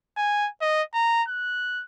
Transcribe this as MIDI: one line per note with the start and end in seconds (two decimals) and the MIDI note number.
0.17 0.48 80
0.62 0.82 75
0.94 1.23 82
1.28 1.84 90